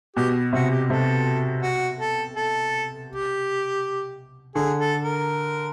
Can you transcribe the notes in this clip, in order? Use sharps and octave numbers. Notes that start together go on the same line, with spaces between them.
B2 G4
C3 F#4
G4
C3 A4
F#4
A4
A4
G4
D3 G#4
A4
A#4